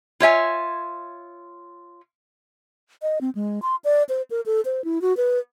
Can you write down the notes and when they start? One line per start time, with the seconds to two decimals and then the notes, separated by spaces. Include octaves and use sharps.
0.20 F4 C#5 E5 G#5
3.02 D#5
3.21 C4
3.35 G#3
3.62 C6
3.84 D5
4.09 C5
4.31 A#4
4.46 A4
4.65 C5
4.84 E4
5.02 F#4
5.17 B4